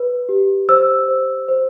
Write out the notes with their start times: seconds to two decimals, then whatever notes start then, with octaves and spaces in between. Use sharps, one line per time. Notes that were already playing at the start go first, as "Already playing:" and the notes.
Already playing: B4
0.29 G4
0.69 C5 E6
1.08 C5
1.48 C5